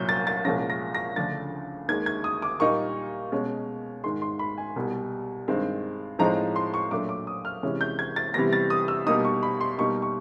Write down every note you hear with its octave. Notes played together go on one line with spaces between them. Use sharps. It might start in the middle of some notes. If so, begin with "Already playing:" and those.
Already playing: C2 A#2 F#3 G6
A6
A6
C2 A#2 F3 G#3 C#4 A#6
A#6
A#6
D2 C#3 F3 A3 D4 A6
D#2 D#3 G#3 G#6
G#6
D#6
D6
A#2 G3 A#3 D#4 C#6
B2 G#3 C#4
G#2 D#3 G#3 C6
C6
B5
G#5
C2 B2 G3
G2 D#3 G#3 C4
A2 F3 G#3 C4 D#4 A#5
C6
C#6
A#2 F#3 A3 D4 D6
D6
D#6
F6
C3 E3 G#3 C#4
G6
G#6
A6
C3 E3 G3 B3 A#6
A6
D#6
E6
B2 G3 A#3 D#4 D#6
C#6
B5
C6
B2 G3 A#3 D#4 C#6
C#6